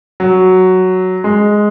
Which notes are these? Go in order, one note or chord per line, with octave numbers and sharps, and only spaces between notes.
F#3
G#3